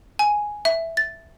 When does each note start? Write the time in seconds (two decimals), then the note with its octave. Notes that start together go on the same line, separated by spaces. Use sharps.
0.19 G#5
0.65 E5
0.97 A6